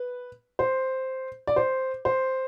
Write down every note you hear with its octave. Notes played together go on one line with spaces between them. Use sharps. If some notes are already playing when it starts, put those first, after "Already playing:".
Already playing: B4
C5
D5
C5
C5